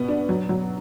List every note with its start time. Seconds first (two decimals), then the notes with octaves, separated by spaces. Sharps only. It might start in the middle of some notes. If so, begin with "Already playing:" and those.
Already playing: B2 B3
0.08 D4
0.29 F#3
0.49 F#3